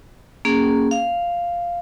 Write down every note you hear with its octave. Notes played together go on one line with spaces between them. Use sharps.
A#3 C#4 G#4
F5